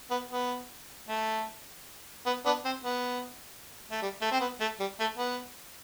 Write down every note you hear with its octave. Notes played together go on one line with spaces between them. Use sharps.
B3
B3
A3
B3
B3 D4
C4
B3
A3
G3
A3
C4
B3
A3
G3
A3
B3